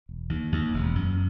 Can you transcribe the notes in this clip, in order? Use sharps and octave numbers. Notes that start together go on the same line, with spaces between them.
E1
D#2
D#2
E1
F#2